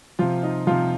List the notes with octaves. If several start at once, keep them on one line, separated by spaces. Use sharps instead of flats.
C3 F3 F4
D#4
C3 F3 F4